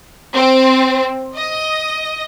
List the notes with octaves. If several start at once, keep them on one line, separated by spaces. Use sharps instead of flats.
C4
D#5